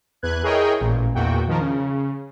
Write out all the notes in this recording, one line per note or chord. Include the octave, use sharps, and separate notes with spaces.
E2 B4 F#6 G#6
E4 G#4 A#4 C#5 D#5 G5
A1 A#2
E2 A#2 F#4 G5
D#3 F3 A#4
C#3